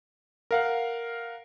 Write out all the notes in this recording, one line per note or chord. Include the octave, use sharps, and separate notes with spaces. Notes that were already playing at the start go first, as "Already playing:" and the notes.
A#4 F5 F#5